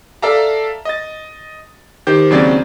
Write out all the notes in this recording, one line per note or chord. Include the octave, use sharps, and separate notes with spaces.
A4 D5 E5 F5 A5 A#5
D#5 A6
D#3 G4 C5 G6
D#2 C#3 F#3 C4 D5 A6